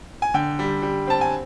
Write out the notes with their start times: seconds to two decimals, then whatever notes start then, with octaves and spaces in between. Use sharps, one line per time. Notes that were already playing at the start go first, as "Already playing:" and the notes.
0.22 G#5
0.34 D3 G5
0.59 G3
0.82 G3
1.07 C4 A5
1.21 G#5